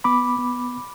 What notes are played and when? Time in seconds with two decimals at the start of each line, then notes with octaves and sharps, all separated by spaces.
0.04 B3 B5 D6
0.38 B3